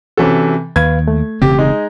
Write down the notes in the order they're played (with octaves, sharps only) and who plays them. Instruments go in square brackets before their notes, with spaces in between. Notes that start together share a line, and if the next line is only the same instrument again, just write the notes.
[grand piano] C3 E3 A4 [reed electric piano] C4 C#4 F#4
[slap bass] D#2 [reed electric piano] B4 F5 [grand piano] G#6
[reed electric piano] A3
[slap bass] E1 C#3 C4 [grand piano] G4
[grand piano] G#3 D#4